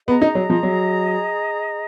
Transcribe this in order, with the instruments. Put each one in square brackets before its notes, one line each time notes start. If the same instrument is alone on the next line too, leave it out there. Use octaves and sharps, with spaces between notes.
[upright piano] B3 [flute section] G#4 D#5 A#5
[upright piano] D#4
F#3
F3
F#3